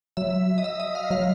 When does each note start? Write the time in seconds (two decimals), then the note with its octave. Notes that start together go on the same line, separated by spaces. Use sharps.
0.17 F#3 E5
0.58 D#5
0.64 E5
0.80 D#5
0.95 F5
1.11 F#3 F5